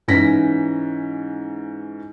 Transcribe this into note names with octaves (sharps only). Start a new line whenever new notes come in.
G#2 E3 C#4 A#6 B6